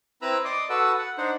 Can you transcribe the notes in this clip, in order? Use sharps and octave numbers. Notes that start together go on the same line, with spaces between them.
C4 E4 B4 A#5 B5 E6
D5 D#5 C6 D6 D#6
F#4 A4 B4 F#5 D#6 E6
F#5
D4 D#4 C5 F#5